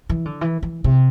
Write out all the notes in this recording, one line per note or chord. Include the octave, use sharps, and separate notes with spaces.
E3
D3
E3
E3
C3